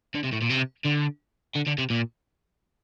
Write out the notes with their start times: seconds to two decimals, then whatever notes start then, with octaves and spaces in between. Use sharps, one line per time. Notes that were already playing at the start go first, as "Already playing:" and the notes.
0.15 D3
0.24 C3
0.33 A2
0.42 A#2
0.50 C3
0.85 D3
1.55 D3
1.67 D3
1.78 C3
1.90 A#2